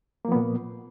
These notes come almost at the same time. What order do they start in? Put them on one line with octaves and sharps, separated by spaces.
A#3 F3 B3 A#2